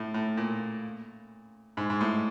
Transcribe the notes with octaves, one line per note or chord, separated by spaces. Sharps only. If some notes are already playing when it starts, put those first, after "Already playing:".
Already playing: A2
A2
A#2
G#2
G#2
A2